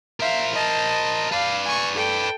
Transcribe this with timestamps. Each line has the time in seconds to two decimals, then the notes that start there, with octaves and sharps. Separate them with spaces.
0.20 A#4 C5 E5 F5
0.53 D#5 A5
1.32 B4 D5 F5
1.65 G#5 C#6
1.95 A4 G5